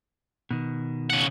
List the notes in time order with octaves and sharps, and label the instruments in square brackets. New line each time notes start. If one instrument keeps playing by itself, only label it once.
[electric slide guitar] B2 D#3
[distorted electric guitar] C#3 F#5